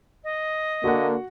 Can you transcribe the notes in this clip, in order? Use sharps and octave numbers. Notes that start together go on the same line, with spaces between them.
D#5
D3 A#3 F#4 F#5